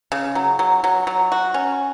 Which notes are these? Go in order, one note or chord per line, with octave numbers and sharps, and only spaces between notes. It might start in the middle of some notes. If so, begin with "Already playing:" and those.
C#3
F#3
F#3
F#3
F#3
F#4
C#4